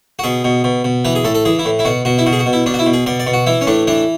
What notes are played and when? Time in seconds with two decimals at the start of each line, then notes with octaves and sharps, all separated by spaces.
0.19 F#4
0.23 B2 G#4
0.44 B2
0.64 B2
0.84 B2
1.05 E3 B4
1.15 G#4
1.24 A2 A4
1.35 A4
1.45 E3 G#4
1.59 E4
1.65 A2
1.79 E4
1.85 B2 F#4
2.05 B2 F#4
2.18 E4
2.26 B2 F#4
2.33 G#4
2.39 F#4
2.46 B2
2.53 E4
2.66 B2 D4
2.74 F#4
2.79 E4
2.86 B2
2.93 G#4
3.06 B2 D5
3.19 D5
3.27 B2
3.33 F#4
3.46 E3 E4
3.61 C#4
3.67 A2 D4
3.87 E3 D4